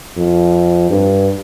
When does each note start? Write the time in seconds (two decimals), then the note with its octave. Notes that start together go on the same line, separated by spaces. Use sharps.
0.17 F2
0.90 G2